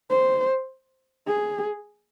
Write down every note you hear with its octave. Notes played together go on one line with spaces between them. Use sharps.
C5
G#4